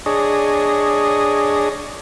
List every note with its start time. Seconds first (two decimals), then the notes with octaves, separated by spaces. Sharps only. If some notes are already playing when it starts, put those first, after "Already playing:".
0.06 D4 G#4 C#5 D#5